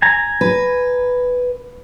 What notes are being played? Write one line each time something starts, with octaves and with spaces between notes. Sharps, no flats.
G#5 A#5
B4